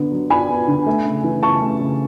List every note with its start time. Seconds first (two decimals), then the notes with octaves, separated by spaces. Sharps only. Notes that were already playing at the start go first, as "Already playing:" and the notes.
Already playing: D3 B3
0.12 F#3
0.30 D4 G#5 B5
0.49 B3
0.68 D3
0.86 A3
1.06 C#3
1.24 E3
1.43 C#3 A5 C#6
1.62 A3
1.81 C#3